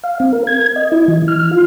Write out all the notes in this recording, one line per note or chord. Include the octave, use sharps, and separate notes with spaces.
F5
C4
A#4
G#6
D#5
E4
E3
F6
F4